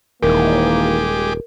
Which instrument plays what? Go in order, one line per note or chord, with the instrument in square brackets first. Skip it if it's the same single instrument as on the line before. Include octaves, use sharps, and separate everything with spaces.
[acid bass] D#1 [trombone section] D#3 E3 A#3 [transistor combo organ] G#3 G4 D6 [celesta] A#4